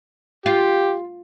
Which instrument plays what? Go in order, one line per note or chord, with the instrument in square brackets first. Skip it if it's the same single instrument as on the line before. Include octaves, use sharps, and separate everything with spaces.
[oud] F4 [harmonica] G4